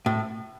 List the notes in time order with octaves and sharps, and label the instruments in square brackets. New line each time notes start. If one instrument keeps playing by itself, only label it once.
[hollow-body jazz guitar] A2